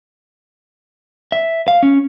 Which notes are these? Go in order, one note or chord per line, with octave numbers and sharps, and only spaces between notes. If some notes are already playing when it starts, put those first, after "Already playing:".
E5
F5
C#4